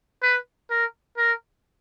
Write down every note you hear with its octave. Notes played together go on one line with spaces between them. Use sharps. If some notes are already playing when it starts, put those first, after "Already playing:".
B4
A#4
A#4